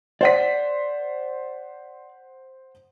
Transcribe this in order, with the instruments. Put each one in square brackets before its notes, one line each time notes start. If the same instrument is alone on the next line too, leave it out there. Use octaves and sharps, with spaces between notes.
[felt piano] C5 F#5 B6 [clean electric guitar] D5